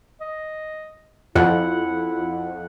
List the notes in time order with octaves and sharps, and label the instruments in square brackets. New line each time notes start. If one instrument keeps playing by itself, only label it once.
[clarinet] D#5
[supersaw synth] F2 [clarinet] E4 [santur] F#5